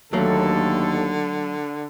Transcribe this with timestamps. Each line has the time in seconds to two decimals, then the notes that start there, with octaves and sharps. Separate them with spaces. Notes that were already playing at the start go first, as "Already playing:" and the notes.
0.13 D#2 D3 F#3 A3 A#3 A4